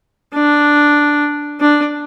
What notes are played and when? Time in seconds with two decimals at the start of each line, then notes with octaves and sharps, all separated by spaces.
0.34 D4
1.61 D4